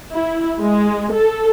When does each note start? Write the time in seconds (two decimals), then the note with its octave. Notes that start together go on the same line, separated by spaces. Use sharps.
0.12 E4
0.59 G#3
1.12 A4